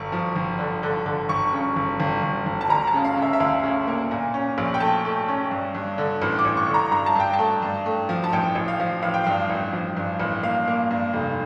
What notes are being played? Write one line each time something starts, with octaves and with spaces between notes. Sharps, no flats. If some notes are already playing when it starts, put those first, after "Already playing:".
Already playing: G1 C#6
F3
G1
D3
D3
D3
G1 C#6
C#3
G1
G1
G1
G1
A5
D2 A#5
A5
C#3
F5
C#3
E5
E5
D2 F5
C#3
A#3
A#2
C#4
A#1
G5
A3 A5
A3
C#4
G2
G2
D3
A1
D6
A1
C#6
D3
A#5
G2 A#5
A5
G2 G5
A5
A3
G2
A3
F3
A5
A1 G5
A1
F5
F3
A1 F5
G5
G2 F5
A1
F3
G2
A1
A#3 F5
A#3
G2
F1